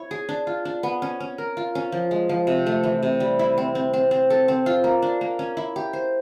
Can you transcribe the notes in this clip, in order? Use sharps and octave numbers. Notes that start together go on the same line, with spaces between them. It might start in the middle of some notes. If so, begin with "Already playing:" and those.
Already playing: E4 C#5
G#4
D4
F4
D4
B3
C#4
C#4
A#4
F4
C#4
F3
G#3
F3
C3
A3
E3
C3
G3
E4
C4
C4
C4
C4
A4
C4
F4
A#3
D4
A#3
C#4
E4
G4
C5